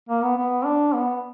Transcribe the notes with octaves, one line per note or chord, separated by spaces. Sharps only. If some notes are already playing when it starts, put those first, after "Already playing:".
A#3
B3
B3
D4
B3